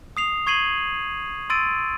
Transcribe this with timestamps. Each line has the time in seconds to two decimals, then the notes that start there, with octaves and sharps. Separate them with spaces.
0.17 D#6 C7 F7
0.47 C#6 G#6 C7 D#7 F#7
1.50 C6 E6 A6 D7 D#7